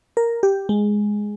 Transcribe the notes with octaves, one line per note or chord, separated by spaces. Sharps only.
A#4
G4
G#3